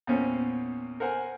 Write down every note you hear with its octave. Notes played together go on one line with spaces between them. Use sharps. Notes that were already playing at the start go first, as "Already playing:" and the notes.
E2 A#2 C4 C#4
A#4 C5 F#5 G#5